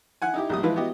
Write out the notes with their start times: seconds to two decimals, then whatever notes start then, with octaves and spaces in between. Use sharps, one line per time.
0.22 E4 F#5 G#5
0.34 D#4 E4 G4
0.49 A#1 A2 G3 D#6
0.63 E3 F3 G#3 E4 F4 B4
0.76 B3 E4 F#4 G4 D#5